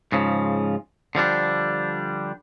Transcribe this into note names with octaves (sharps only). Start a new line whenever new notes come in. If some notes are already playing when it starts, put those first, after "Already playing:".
G#2 C#3 F3
D3 F3 G3 D4